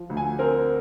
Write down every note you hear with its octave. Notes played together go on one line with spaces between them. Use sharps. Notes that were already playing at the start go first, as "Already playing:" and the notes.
Already playing: F3
D2
G#5
C4 A#4